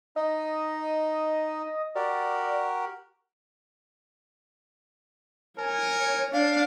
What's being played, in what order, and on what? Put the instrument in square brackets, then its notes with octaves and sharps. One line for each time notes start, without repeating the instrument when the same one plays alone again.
[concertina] D#4 [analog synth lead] D#5
[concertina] F#4 G4 A#4 [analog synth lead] D5
[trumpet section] A#4 G#5 [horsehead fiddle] C#5
[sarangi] D4 [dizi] F5